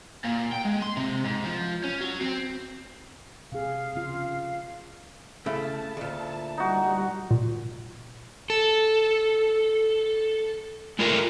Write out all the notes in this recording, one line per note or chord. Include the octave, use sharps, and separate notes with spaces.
A#2
G5
G#3
C6
C3
G#2
F3
C#4
F#3
C4
C3 G#4 F5
C#3 F4
C#3 A3 E4 A5
D2 A#2
G3 D#4 F#4
A#2
A4
G#3 A3 E4 F4 A#4